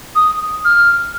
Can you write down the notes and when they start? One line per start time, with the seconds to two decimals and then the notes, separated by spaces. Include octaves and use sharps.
0.15 D#6
0.65 F6